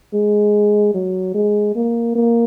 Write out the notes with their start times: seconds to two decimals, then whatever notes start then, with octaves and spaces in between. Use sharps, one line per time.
0.14 G#3
0.94 F#3
1.35 G#3
1.76 A#3
2.15 A#3